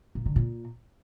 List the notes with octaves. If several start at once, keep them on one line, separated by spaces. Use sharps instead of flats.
A#2
D3
A#2